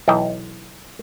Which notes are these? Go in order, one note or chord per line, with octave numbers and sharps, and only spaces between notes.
B1 E3 D#5 G5